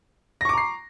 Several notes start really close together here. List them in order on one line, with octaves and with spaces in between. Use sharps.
A#6 C#6 D6 A#5 C7